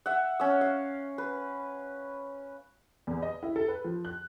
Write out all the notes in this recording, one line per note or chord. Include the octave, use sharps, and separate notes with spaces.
E5 F#5
C#4 E6
F5
B4
E2
D#5
E4
A4
B4
F3
F#6